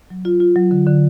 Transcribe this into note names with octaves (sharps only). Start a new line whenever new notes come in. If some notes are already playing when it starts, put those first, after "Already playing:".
F#3
F4
F4
F#3
D3
D3